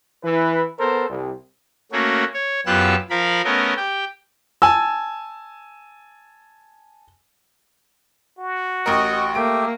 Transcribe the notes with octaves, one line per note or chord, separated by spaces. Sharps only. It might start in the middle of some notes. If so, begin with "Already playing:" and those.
E3 B4
B3 A4 A#4 C5
C2
A3 A#3 C#4 F#4
C#5
F#2 B3 F4 G4 E6 F#6
F3 A#4 F5 B5
A3 B3 C#4 A#4 D#5
G4 G5
G#5 A5 E6
F#4
A1 A#4 D#5 C#6
A3 A#3 G4 D7